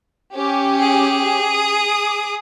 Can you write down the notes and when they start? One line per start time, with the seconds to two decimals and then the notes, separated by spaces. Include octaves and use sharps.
0.33 C#4 G4
0.80 G#4
1.51 D#6